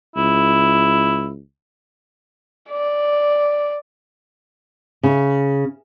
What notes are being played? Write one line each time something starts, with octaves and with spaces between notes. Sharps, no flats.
C#2 E4
D5
C#3